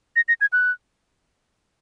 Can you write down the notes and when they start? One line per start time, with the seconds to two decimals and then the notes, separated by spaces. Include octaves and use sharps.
0.16 A#6
0.28 A#6
0.41 G#6
0.53 F#6